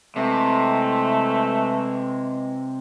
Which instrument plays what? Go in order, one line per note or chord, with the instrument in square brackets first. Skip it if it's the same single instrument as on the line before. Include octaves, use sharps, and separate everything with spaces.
[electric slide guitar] C3 [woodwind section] E3 G#3 [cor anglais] A3